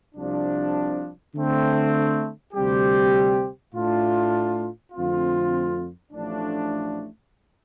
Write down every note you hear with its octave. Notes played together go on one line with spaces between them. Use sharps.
C2 C3 F3 D4
D3 A3 C4
D2 C3 G3 C4 G4
A2 A3 D4 F4
F2 D3 A3 C4 F4
A1 A2 F3 A3 D4